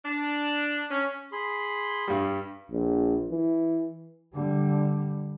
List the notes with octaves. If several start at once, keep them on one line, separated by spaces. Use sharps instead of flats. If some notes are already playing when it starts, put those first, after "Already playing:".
D4
C#4
G#4 B5 C6
G2 G3
A#1
E3
D3 G3